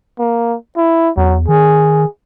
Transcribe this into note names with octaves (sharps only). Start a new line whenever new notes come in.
A#3
E4
E2 F#3
D#3 G#4